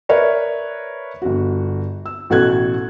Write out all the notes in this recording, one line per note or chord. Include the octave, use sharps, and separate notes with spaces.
A#4 B4 C#5 D5 E5 F6
G1 F#4
E6
A1 B2 F#4 A4 F#6 G#6